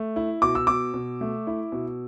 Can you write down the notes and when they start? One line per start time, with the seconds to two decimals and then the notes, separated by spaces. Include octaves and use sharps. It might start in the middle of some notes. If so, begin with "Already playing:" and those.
Already playing: A3
0.16 E4
0.42 B2 D6
0.55 E6
0.67 B2 D6
0.94 B2
1.21 A3
1.47 E4
1.72 B2